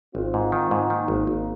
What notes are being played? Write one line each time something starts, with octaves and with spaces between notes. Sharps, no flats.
G#1 C4 F4
G#2
D#3
G#2
D#3 A#3 D#4
G#1
G#1